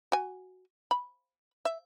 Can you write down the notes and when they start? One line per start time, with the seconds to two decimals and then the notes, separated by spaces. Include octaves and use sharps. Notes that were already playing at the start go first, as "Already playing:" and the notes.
0.12 F#4 G#5
0.91 B5
1.65 E5